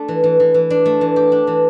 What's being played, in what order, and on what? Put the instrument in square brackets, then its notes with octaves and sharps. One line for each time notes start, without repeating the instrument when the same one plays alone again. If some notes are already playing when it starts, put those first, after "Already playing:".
Already playing: [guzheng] A3 D4
E3
E3
E3
E3
D4
A3
E3
G4
D4
E3